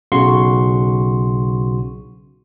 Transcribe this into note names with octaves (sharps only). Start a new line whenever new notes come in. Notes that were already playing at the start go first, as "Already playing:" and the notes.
B1 C#3 F#4 C6 C#6